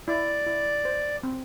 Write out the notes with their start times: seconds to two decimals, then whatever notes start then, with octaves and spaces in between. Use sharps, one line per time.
0.08 E4 D5
0.46 E4
0.85 C5
1.23 C4